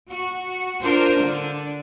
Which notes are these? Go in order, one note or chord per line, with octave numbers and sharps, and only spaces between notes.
F#4
D4 F4 A#4 C5
D3 D4